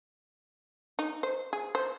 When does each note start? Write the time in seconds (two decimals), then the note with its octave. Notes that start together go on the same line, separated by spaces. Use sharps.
0.99 D#4
1.23 C5
1.53 G#4
1.75 C5